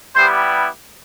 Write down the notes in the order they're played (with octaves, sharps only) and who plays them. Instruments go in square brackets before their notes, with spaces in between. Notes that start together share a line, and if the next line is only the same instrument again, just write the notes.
[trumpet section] G3 B3 E4 G4 C5